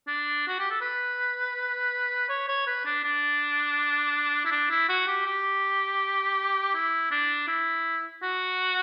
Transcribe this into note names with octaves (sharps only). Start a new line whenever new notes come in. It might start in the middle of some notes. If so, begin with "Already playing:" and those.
D4
F#4
G4
A4
B4
C#5
C#5
B4
D4
D4
E4
D4
E4
F#4
G4
G4
E4
D4
E4
F#4